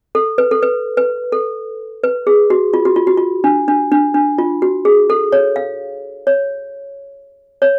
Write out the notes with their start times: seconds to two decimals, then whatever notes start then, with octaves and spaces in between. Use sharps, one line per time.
0.15 A4
0.38 B4
0.51 A4
0.63 B4
0.97 B4
1.32 A4
2.04 B4
2.27 G#4
2.50 F#4
2.74 F4
2.85 F#4
2.96 F4
3.07 F#4
3.17 F4
3.44 D4
3.68 D4
3.92 D4
4.14 D4
4.38 F4
4.62 F#4
4.85 G#4
5.10 A4
5.32 C#5
5.56 F5
6.27 C#5
7.62 C#5